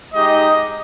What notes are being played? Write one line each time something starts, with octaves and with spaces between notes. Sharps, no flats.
G#3 D#4 G4 D#5